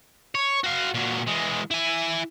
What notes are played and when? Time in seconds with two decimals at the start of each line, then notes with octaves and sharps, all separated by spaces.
0.35 C#5
0.64 F#4 F5
0.95 A#2 F#3
1.28 E3 G#3
1.71 E4 G#5